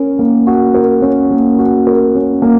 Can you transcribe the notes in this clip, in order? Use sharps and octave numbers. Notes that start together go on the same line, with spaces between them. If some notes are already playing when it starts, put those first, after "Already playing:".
Already playing: C#4 A#4
A#3
F#4
A#4
C#4
A#3
F#4
A#4
C#4
A#3